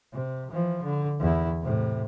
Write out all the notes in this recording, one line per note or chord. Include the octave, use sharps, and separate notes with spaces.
C3
E3 F3
D3
E2 E4
A2 C3